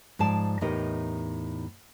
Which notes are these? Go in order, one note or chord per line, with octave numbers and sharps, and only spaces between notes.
G#2 F3 D5 A5
E2 A2 D#4 G4 A#4 D#5